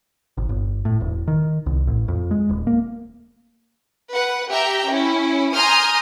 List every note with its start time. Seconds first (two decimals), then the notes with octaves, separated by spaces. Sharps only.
0.37 G#1
0.49 G1
0.85 A2
1.01 E1
1.28 D#3
1.66 C2
1.87 A1
2.08 F2
2.31 G#3
2.49 D#1
2.67 A#3
4.13 B4 F#5
4.50 G4 E5 G5 A#5
4.88 C#4 E4
5.54 G#5 A#5 C6 D#6 F6 G6